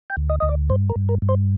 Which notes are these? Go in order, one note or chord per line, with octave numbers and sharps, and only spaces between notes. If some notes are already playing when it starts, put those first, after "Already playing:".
G5
D2
D#5
D2 D#5
D5
G2 C5
A#4
G2
A#4
G2
C5